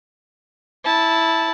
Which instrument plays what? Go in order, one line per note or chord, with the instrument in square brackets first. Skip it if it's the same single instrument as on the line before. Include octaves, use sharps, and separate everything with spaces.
[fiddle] E4 A5